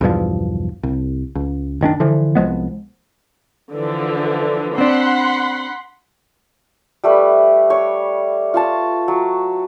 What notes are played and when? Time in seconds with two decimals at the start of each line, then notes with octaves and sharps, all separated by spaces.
0.01 B1 E2 G2 F3
0.83 C2
1.35 C#2
1.81 F#1 D#3 C#4 D4
2.00 D3 E3 F3
2.35 C2 F3 G#3 B3
3.73 D3 E3 F3
4.78 C4 D4 F#5 B5 C6
7.04 G3 A3 B4
7.70 C#5
8.54 F4 C#5 A5
9.08 F#3